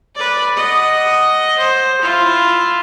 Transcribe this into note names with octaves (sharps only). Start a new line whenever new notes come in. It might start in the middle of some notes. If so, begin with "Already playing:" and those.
B4 D5
D#5 F#5
C5
E4 F4